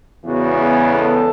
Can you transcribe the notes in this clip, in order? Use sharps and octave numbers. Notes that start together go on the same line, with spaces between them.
E2 C#3 E3 G#3 B3 F#4
G#4
A4